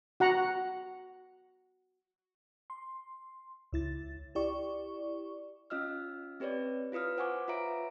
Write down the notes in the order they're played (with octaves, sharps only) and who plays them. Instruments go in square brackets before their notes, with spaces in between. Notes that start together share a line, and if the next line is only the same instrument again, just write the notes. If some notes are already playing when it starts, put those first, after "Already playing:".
[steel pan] F#4 F#5 A#5
[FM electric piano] C6
C#2 E4 A6
E4 G4 D5 C#6
[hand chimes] C#4 F4 D#5 E6 F6
C4 G4 B4 C#5 D5
E4 F4 B4 D#6 F6
C5 F#5 G#5 C#6 D6
F4 B4 C#5 E5 A#5 D7